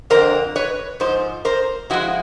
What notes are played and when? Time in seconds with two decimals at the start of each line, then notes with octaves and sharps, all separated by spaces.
0.10 F2 D3 F#3 A#4 C5
0.56 B4 C#5
1.00 G#2 F3 C5
1.45 A#4 C5
1.90 A2 F3 G#3 E4 F#4